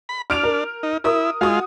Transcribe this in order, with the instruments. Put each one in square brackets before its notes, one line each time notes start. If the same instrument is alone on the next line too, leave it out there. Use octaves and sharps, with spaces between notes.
[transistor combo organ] B5
[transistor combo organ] D4 [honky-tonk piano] F6 D7 F7
[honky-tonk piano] A#4
[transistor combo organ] D#4
[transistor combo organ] E4 [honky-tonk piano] A#4 D#6
[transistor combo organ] G#3 F4 [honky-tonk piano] F#4 D#6